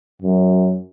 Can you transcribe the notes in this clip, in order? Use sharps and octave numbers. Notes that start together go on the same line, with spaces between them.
F#2